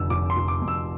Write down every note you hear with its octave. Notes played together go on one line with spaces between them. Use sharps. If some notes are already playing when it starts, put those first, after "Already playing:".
Already playing: F1 F2 D3 E6
F1 D6
C6
F1
D6
F2
E6